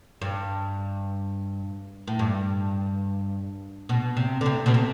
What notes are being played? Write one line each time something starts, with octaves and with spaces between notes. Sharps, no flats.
G2
A2
G2
B2
C3
D3
C3
B2
C3